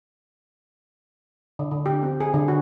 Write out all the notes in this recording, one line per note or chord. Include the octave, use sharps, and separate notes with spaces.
D3
D3
G4
C4
G#4
D3
F#4